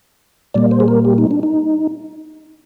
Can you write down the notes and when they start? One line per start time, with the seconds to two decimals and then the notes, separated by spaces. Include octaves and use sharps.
0.54 A#2 G3 A#3 D5
0.71 C5
0.80 G#4
0.88 A#4
1.05 G4
1.18 D#4
1.31 D4
1.43 D#4